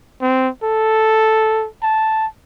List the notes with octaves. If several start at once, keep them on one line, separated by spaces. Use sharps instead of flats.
C4
A4
A5